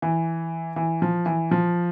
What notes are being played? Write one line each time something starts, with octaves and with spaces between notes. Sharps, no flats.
E3
E3
F3
E3
F3